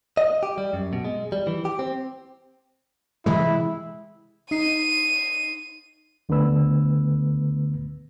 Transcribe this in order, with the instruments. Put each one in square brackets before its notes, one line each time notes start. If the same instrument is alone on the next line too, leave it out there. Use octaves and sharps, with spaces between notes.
[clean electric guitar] D#5
G4
G3
F#2
B2
G#3
G3
E3
G4
C4
[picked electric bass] C3 E3 G#3 [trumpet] E4
[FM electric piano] D#4 C7 [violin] D#7
[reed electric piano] C#2 D3 A3 B3 B4 E6